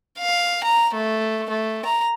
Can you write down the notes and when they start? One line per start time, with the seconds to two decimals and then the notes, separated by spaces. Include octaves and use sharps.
0.19 F5
0.64 A#5
0.95 A3
1.50 A3
1.85 A#5